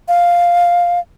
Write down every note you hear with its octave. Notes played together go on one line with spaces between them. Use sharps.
F5